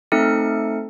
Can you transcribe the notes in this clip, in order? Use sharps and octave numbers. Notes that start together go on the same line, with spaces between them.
A3 C4 D#4 A4 C#7